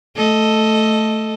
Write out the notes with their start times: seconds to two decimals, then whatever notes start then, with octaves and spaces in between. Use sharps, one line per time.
0.16 A3 A4 D#5